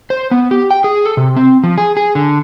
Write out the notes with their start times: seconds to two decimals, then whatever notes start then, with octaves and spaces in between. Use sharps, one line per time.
0.10 C5
0.31 B3
0.51 G4
0.70 G5
0.84 G#4
1.05 A4
1.17 C3
1.36 C4
1.64 F3
1.78 G#4
1.97 G#4
2.15 D3